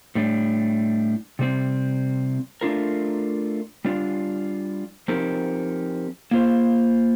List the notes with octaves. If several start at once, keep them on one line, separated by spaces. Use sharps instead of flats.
A2 G3 D4
C3 G3 C4
A3 D4 F4 A#4
G3 D4 F4
F3 C4 D#4 G4 A#4
A#3 F4 C5